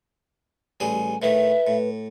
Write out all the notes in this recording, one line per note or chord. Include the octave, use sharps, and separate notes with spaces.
A1 G3 G#4 G#5
A2 D#3 B4 E5
A2